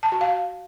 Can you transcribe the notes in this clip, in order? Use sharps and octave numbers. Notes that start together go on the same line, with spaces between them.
A5
F#4
F5